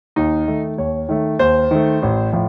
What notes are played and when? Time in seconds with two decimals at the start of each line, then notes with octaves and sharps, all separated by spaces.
0.16 D#2 D#4
0.48 D#3 A3
0.78 D#2 C#5
1.09 D#3 A3
1.39 D#2 C5
1.71 D#3 A3
2.02 A1
2.33 A2 F3